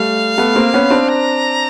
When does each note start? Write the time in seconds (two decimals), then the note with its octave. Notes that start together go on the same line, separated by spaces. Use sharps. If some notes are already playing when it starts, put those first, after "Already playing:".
Already playing: G3 A3 F5
0.38 A3 B3
0.56 A#3 C4
0.74 B3 C#4
0.90 C4 D4
1.09 A#5